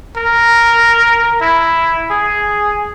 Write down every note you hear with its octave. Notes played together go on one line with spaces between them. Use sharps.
A#4
E4
G#4